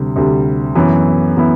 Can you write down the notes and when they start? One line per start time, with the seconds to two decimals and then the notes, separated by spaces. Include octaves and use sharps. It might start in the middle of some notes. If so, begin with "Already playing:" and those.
Already playing: D2 C3 G3
0.16 D2 C3 G3
0.75 F#2 E3 B3 E4
1.37 E3 B3 E4